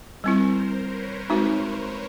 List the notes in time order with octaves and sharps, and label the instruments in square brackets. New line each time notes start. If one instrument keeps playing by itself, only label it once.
[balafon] G3 C4 E4 [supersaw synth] A#4 C5
[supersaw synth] B4 C#5
[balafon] G#3 C4 D#4 F#4